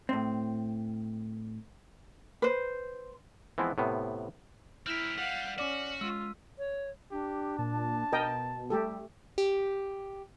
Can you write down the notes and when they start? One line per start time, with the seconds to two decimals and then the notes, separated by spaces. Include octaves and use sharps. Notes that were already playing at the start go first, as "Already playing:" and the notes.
0.09 A2 C4
2.42 B4 C5
3.58 E3 F3 G#3 B3 C4 E4
3.78 A2 C3 B3
4.86 C4 E4 A#4 F6 B6
5.18 G3 F5 F#5
5.59 C#4 F#4 D5 D6
6.01 G#3 F4 E6 D#7
6.58 C#5
7.12 D4 G4
7.59 A#2 A5
8.12 B2 A#4 D#5 G5
8.70 G3 A3 G4 A4
9.38 G4